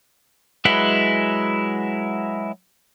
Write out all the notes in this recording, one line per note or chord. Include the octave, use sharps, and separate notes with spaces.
F#3 G#3 E4 B4 F#5